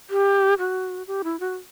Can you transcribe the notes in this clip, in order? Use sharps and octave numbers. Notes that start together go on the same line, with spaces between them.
G4
F#4
G4
E4
F#4